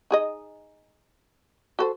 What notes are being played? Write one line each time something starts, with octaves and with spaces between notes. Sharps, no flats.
D#4 G#4 D#5
F#4 A4 C5